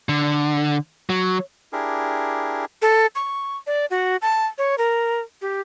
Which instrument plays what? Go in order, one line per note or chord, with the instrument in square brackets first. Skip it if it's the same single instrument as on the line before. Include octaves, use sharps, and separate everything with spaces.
[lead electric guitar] D3
F#3
[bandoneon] D4 E4 G4 G#4 A#4
[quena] A4
C#6
D5
F#4
A5
C#5
A#4
G4